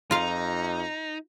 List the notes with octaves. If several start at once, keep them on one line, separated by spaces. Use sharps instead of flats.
F2 D#4 F4 F5 A#5